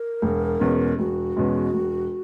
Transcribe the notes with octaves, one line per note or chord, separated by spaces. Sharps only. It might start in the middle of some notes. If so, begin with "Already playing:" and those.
Already playing: A#4
E1
E2 B2 G#3 C#4
E1 F#4
E2 B2 G#3 C#4
E1